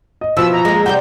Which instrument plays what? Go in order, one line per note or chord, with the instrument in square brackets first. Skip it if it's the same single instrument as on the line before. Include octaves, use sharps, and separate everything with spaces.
[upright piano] D#5
[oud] B2 E3 B3 [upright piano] F3 [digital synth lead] E6
[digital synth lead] A#5
[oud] G#3 A#3
[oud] C3 G3 C4 [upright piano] F#5 [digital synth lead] G6